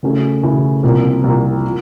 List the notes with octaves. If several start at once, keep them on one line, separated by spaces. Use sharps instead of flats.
C#3 E3 A3 C#4 F#4
C#3 E3 A3 C#4 F#4
C2 C3 F3 A#3
C2 C3 F3 A#3
F3